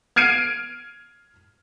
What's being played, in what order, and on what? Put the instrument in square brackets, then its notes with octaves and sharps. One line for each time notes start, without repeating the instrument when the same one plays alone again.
[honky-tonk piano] F6 G#6 C7 D7 D#7